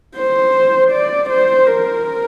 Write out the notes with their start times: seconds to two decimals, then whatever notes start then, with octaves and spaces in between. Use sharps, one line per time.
0.16 C5
0.91 D5
1.29 C5
1.67 A#4